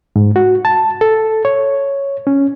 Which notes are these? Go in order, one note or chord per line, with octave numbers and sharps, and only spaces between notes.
G#2
F#4
A5
A4
C#5
C#4